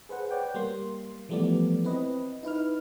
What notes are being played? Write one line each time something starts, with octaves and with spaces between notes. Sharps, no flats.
G#4 B4 C5 F#5
B4 C#5 D5 F#5 G5
G3 A#3 C6
E3 F3 G3 A3 B3 D5
C4 E4 B4 D#5
D#4 E4 B4 F6